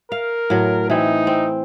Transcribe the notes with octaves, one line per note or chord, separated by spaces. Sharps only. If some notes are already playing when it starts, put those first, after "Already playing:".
A#4 F5
A2 F#3
E3 C4 D#4
C4